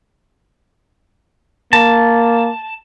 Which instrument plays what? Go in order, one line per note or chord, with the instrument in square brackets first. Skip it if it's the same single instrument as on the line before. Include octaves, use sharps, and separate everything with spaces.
[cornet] A#3 [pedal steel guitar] A5